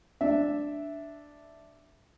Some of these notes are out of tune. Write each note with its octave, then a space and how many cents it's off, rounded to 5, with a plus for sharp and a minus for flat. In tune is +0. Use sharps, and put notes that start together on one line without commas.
D4 +0 E5 +0